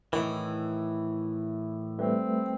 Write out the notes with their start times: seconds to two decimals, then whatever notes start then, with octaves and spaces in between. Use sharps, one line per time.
0.13 A2 D#3 E3
1.99 G3 A3 C4 B4